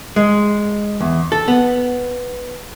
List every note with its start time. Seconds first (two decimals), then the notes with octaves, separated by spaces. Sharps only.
0.16 G#3
1.00 E2
1.32 A4
1.48 B3